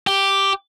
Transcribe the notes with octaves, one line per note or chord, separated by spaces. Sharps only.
G4